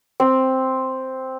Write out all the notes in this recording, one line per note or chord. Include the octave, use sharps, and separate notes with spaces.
C4